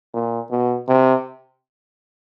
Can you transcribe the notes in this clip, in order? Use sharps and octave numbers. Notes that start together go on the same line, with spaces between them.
A#2
B2
C3